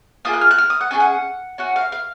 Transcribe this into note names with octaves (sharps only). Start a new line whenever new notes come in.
A#3 F4 G#4 D#6
F#6
F6
F#6
F6
D#6
F#5
C#4 F4 G#4 G#5
F#5
C#4 F#4 F#5
F5
F5